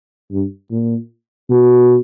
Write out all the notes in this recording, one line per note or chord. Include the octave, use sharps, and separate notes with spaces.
G2
A#2
B2